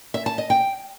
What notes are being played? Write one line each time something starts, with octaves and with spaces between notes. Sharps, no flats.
E5
A5
D#5
G5